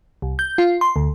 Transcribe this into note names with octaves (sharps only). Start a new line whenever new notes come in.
C2
G6
F4
C6
D2